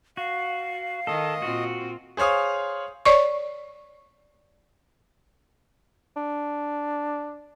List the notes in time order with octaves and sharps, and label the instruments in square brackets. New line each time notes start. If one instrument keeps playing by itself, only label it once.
[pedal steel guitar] F#4 [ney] F5
[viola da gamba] D#3 [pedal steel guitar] A4 [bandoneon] D#5
[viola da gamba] A#2 C4 F4 [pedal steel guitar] F#4
[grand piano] G#4 C5 C#5 F5 D#6
[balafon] C#5 D5 C#6
[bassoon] D4